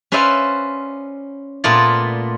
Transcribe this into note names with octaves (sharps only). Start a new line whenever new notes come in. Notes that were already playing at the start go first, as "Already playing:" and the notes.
C#4 B4 C5 D5 E5 F5
A#2 A3 B3 F4 D5